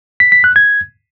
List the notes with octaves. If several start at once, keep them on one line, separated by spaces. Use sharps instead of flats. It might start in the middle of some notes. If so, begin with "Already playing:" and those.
B6
B6
F#6
G#6